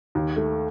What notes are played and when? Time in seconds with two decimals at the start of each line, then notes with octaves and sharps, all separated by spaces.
0.15 D#2
0.36 A3